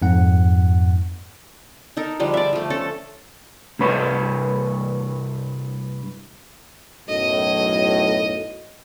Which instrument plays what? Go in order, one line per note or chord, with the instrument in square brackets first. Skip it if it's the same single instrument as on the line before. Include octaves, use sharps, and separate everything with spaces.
[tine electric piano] F2 G#2 F#5
[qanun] D#4 A4 A#4
D3 F3 G3 G#3
D5 E5
F3 A3
C#4 A4
[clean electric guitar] C2 G2 B4 C#5
[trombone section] B1 F#2 A2 [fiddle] D#5